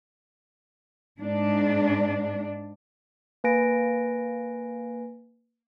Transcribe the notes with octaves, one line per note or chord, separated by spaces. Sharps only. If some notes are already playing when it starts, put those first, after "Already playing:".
G#2 D4
A#3 B4 G#5 A#6 D7